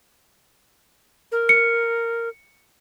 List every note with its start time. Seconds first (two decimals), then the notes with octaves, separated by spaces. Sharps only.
1.32 A#4
1.49 C#7